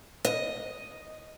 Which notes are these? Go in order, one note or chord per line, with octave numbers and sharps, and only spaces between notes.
D#5